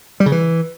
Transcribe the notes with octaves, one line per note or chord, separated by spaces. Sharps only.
G3
C#3
E3